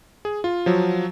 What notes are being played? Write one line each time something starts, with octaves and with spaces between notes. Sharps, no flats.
G#4
F4
F3 F#3